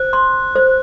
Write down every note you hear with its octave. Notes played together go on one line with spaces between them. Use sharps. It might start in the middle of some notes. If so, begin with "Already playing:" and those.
Already playing: C5 F#6
C6
C5